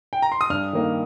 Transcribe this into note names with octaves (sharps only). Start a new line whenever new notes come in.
G5
A#5
C6
D#6
G2 F6
D#3 A#3